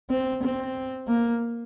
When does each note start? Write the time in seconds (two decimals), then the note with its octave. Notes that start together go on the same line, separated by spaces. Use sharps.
0.10 C4
0.43 C4
1.08 A#3